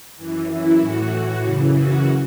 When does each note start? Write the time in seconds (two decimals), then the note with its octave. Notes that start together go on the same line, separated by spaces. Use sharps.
0.16 F#2 E3
0.48 E4
0.79 A2 E3 F#4
1.42 F#2 C#3 E3
1.74 F#4